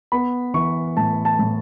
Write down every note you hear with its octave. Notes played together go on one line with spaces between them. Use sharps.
B3 B5
E3 C#6
A2 A5
A5
A2